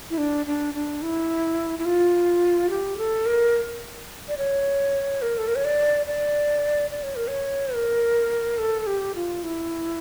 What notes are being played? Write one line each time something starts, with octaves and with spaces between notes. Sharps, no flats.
E4
D4
D4
D4
E4
E4
F4
G4
A4
A#4
D5
C#5
A#4
A4
A#4
C#5
D5
D5
D5
C#5
A#4
C#5
A#4
A4
G4
F4
E4